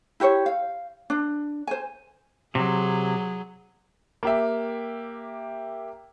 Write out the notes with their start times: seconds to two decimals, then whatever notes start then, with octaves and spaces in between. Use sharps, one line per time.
0.20 E4 G4 C5 C#5
0.46 F5
1.10 D4
1.67 C5 G#5
2.55 C3 F#3 G#4
4.23 A#3 G4 E5